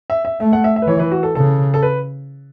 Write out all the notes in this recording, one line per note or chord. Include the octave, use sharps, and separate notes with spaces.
E5
E5
A3 E5
F#5
E5
E5
B4
E3 C#5
B4
F#4
A4
C#3 A4
A4
B4